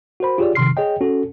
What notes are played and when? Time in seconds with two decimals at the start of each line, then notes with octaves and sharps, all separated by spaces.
0.20 F#4 A#4 C5 B5
0.38 F4 G4 G#4 C#5 D5
0.55 C3 D#3 F3 C6 F6 C7
0.77 G#4 C#5 D#5 G5
1.01 C#4 F#4 A4